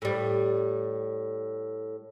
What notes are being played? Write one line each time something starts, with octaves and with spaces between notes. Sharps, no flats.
A2 G3